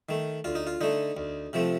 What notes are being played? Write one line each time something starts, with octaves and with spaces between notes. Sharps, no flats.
D#3 A3
D2 F4
D#4
F4
D3 A3 D#4
D2
C3 F3 A3